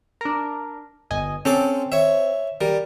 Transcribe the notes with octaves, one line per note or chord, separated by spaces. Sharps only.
D4 A#4
G1 D#5 G#5
C4 C#4 A4 D6
C#5 E5
G3 A#4